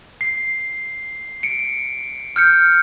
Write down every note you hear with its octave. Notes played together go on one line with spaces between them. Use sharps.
C7
C#7 D7
F6 G6 C#7